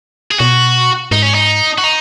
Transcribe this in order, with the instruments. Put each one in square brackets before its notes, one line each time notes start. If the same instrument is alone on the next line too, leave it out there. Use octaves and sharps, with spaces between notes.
[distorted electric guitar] G#4
[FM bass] B2 [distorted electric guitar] F#4
[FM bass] G#2 [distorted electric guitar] D#4
[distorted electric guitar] C#4
D#4
F#4
D#4